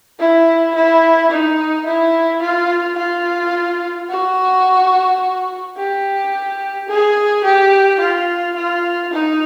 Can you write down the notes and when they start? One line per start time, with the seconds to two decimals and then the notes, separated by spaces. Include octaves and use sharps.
0.19 E4
0.75 E4
1.31 D#4
1.86 E4
2.42 F4
2.98 F4
4.10 F#4
5.77 G4
6.88 G#4
7.44 G4
8.00 F4
8.56 F4
9.13 D#4